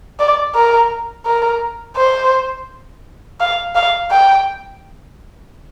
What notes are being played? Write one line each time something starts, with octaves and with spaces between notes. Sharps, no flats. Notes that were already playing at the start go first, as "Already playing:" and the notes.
D5
A#4
A#4
C5
F5
F5
G5